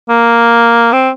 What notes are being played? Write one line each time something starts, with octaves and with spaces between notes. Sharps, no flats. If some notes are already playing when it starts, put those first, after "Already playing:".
A#3
C4